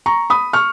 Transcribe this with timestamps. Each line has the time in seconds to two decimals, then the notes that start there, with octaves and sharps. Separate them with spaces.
0.06 A#5 C#6
0.30 B5 D#6
0.53 C#6 F6